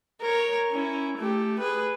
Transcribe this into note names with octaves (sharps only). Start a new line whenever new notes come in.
A#4 C#5
C#4 E4
A3 G4
G#4 B4